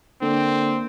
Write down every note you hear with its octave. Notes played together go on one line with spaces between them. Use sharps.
D3 A#3 C4